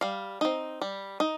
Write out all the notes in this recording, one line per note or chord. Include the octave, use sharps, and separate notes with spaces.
G3 F5
C4 D#4
G3
D#4